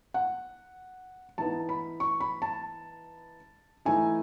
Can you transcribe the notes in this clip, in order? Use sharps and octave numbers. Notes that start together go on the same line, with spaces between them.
F#5
E3 B3 D#4 A5
B5
C#6
B5
A5
E3 A3 D#4 G#5